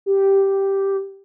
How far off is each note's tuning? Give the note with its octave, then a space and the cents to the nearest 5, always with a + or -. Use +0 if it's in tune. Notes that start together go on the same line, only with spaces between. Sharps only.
G4 -5